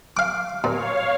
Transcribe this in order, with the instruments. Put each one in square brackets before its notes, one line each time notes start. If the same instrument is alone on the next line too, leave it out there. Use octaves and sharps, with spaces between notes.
[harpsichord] F5 D6
[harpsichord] A#2 [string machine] C#5 F5